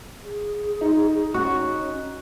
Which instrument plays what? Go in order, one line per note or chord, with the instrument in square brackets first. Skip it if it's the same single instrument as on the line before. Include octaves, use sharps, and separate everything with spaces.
[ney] G#4
[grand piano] D#4
[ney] C#4 [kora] F#4